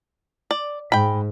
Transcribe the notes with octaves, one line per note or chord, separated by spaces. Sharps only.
D5
G#2 G5 B5